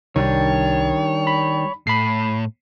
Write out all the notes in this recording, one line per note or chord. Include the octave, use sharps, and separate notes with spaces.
C2 D#3 G3 D4 C#5
B5
A2 B5 C7